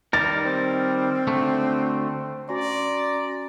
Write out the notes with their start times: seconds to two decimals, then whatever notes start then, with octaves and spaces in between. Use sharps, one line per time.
0.13 D#3 G3 A#4 A6
0.46 C4
1.27 D2 D3 A3
2.49 C#4 F#4 D5 G#5 A#5 C6